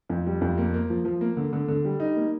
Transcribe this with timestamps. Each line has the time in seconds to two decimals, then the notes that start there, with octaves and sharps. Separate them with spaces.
0.10 F2
0.27 G3
0.41 F2
0.58 A#3
0.74 A#3
0.90 F3
1.05 F3
1.21 A#3
1.37 D3
1.53 D3
1.68 D3
1.85 G3
2.00 D#4
2.16 A#3